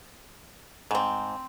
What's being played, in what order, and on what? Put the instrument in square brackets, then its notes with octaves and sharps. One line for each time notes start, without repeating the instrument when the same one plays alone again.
[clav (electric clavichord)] G#2 [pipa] A3 C4